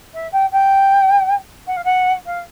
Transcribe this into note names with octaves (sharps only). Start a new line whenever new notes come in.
E5
G5
G5
F#5
F5
F#5
F5